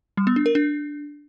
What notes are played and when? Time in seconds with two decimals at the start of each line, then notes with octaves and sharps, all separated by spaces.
0.17 G3
0.27 B3
0.36 D4
0.46 A#4
0.55 D4